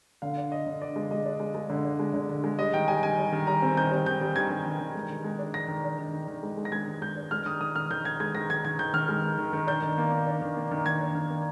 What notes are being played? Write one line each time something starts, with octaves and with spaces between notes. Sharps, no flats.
D3 F5
D4
D4 D#5
D3
D4 D5
G#3
G#3 D#5
D4
G#3
G#3
D3
D4
G#3
D3
D3
G#3
G3 D#5
D#3 G5
G3 G#5
D#3 G#5
G3
D#3
G3 A#5
C4
D#3 G6
G3
D#3 G6
G3
D#3 G#6
D#3
D#3
D#3
G#3
D#3
G#3
D4
D#3 A#6
D#3
D4
D#3
D#3
D#3
G#3
G#3
A#6
G#3 G#6
D#3
G#3 G6
D4
G#3 F6
D#3 D#6
D#3 D#6
D#3 F6
D#3 G6
D#3 G#6
G#3 G#6
D#3 A#6
D#3 G#6
D#3 G#6
D#3 G6
D#3 F6
G#3
D#3
D#3
D#3
D4 G6
D#3
A#3
A#3
D4
D#3
A#3
D#3
D#3 G#6
D4
D#3
A#3